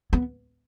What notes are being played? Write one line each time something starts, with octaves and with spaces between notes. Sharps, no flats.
B3